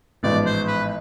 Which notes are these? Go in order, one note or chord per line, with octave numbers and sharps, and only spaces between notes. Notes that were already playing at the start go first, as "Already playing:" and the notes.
A1 G#2 F3 B3 D5
C5
B4